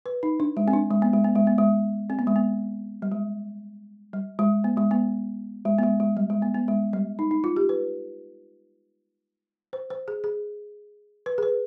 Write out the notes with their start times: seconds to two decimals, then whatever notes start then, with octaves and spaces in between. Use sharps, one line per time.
0.06 B4
0.23 D#4
0.40 D4
0.57 G#3
0.68 C4
0.73 D4
0.91 G#3
1.02 B3
1.13 G#3
1.24 B3
1.35 G#3
1.47 B3
1.58 G#3
2.10 C4
2.19 B3
2.27 G#3
2.36 B3
3.02 G3
3.12 G#3
4.13 G3
4.39 G#3
4.64 B3
4.77 G#3
4.91 B3
5.65 G#3
5.79 B3
5.83 G#3
6.00 G#3
6.17 G3
6.30 G#3
6.42 B3
6.55 B3
6.68 G#3
6.93 G3
7.19 D#4
7.31 D#4
7.44 F4
7.56 G4
7.69 B4
9.73 C5
9.90 C5
10.08 G#4
10.24 G#4
11.26 B4
11.38 G#4
11.43 B4